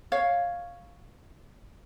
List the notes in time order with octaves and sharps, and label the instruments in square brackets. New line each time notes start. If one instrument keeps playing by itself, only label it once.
[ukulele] C#5 F5